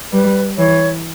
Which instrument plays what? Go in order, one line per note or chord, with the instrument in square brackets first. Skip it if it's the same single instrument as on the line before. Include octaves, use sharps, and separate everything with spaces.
[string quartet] G3 [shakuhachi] B4
[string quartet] E3 [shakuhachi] C#5